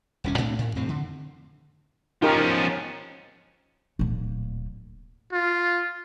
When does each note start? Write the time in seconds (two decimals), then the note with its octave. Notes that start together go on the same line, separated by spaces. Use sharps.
0.24 D#1 C2 C#4
0.38 A2 A3 C4 D4
0.59 A2
0.75 F2 A2 C3 C4
0.89 D3
2.22 F3 C#4 D#4 G4 A#4
3.99 D1 A#2
5.32 F4